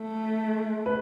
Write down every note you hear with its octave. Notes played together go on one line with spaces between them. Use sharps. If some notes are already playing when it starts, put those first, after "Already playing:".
Already playing: A3
B4